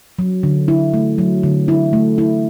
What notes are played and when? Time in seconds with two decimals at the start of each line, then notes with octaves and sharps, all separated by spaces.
0.19 F#3
0.43 D3
0.68 E4
0.94 A3
1.18 F#3
1.43 D3
1.68 E4
1.93 A3
2.18 E4